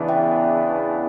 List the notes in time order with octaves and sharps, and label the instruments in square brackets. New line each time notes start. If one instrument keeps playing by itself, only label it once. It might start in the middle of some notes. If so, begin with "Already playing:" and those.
Already playing: [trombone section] E2 C#3 E3 B3 D4
[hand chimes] E5 G5